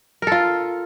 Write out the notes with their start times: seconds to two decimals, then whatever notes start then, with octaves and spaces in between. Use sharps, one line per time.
0.22 A#4
0.27 A4
0.32 F4